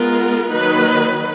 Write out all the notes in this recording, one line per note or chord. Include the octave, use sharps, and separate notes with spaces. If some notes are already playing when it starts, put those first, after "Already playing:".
Already playing: G#3 B3 F4 A#4
D#3 F#3 A#3 D#4 B4